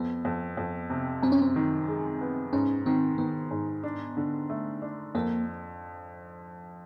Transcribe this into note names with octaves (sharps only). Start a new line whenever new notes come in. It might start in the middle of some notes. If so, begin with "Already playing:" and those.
Already playing: F2 B3
F2
F2
C3
F#2 C4
C#4
C4
D#3
G#3
B3
G#2 C#4
D#3 C4
D#3 B3
G#2
D4
D3
A3
D4
F2 A#3